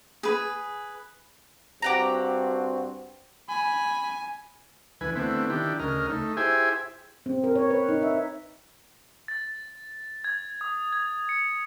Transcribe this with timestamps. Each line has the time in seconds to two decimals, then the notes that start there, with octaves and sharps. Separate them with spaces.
0.23 G#4 B4
1.82 G2 C4 F#4 G4 F#5 A#5
3.49 G#5 B5
5.01 D2 E3 B4 G#5
5.16 D3 A3 B3 C4 E4
5.50 D#3 D4 E4 G4
5.79 D2 C#3 A#4 D#5 F6
6.09 A3 D#4
6.37 E4 G4 G#4 C5 E5 G#5
7.26 C4
7.44 A#4
7.55 C#5
7.71 B4
7.89 D#4
8.03 E5
9.28 A6
10.24 G#6
10.61 D#6
10.92 G#6
11.29 C#7